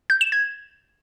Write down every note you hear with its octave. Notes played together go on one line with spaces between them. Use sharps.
G6
E7
G#6